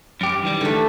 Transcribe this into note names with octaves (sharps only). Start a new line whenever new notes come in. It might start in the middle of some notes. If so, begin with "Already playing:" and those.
F#2 G4
D#3 E3 G3
D3 A3